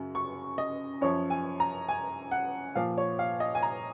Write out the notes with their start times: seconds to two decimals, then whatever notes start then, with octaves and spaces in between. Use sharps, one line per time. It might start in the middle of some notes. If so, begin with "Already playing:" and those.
Already playing: F#2 C#3 F#3
0.15 C#6
0.58 D#5
1.01 F#2 F3 C#5
1.30 G#5
1.60 A#5
1.89 G#5
2.31 F#5
2.75 A#2 F3 F5
2.98 C#5
3.19 F5
3.40 D#5
3.55 G#5
3.62 A#5